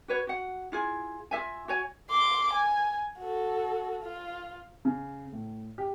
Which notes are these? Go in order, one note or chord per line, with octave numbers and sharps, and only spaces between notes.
F#4 B4 C#5
F#4 F#5
E4 F4 G#4
F4 G#4 E5 G#5
F#4 C#5 G#5
C6 D6
G#5
F#4 A4
F4
C#3
A2
G4